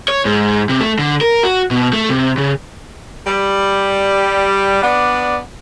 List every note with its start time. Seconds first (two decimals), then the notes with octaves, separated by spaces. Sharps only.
0.08 C#5
0.25 G#2
0.69 C3
0.81 A3
0.99 D3
1.21 A#4
1.43 F#4
1.71 B2
1.93 A3
2.09 C3
2.38 C#3
3.26 G3
4.82 B3 D4 D5